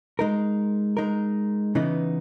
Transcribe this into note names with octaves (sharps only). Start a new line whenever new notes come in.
G#3 D#4 A#4
G#3 D#4 A#4
C#3 E3 B3 D#4